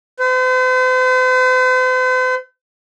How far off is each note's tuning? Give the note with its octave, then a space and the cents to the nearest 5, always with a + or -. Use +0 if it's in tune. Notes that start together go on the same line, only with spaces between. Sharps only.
C5 -45